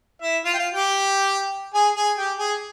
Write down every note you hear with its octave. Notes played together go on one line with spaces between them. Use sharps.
E4 E5
F4 F5
G5
F4 F5
G4 G5
G#4 G#5
G#4 G#5
G4 G5
G#4 G#5